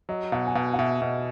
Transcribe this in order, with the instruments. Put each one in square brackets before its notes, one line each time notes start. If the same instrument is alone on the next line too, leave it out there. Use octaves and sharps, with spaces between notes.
[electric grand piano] F#3 [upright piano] D#5
[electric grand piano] B2 [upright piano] F#5
[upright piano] G#5
[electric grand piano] B2 [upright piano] F#5
[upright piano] F#5
[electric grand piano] B2 [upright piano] E5
[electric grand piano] B2 [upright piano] D#5